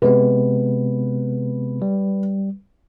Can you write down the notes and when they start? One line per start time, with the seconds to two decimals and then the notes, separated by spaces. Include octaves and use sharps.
0.02 C3 G#3 B3 B4
1.82 G3